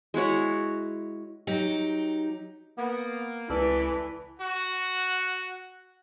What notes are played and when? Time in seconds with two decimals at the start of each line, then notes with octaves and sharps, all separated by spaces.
0.14 G#3 E4 F#4 C#5
1.47 F#3 D#4 G4
2.78 A#3 B3
3.50 C#2 C3 E3 A3 A4 D5
4.39 F#4 F#5